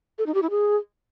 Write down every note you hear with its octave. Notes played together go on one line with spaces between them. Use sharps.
A4
D#4
G4
E4
G#4